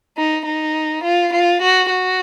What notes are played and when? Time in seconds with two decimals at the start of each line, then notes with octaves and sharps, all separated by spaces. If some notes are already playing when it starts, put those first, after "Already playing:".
0.17 D#4
0.46 D#4
1.04 F4
1.33 F4
1.62 F#4
1.90 F#4